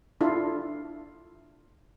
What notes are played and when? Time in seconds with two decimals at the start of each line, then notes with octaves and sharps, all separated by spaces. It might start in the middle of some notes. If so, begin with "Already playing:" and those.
0.21 D4 E4 F4 A4